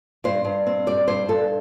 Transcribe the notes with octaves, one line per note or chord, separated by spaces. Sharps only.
G2 C5
G2
C4
G3 D5
G2 C5
G2 A4